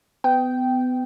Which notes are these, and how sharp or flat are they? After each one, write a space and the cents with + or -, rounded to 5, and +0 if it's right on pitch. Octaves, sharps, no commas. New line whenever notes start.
B3 +30 G5 -10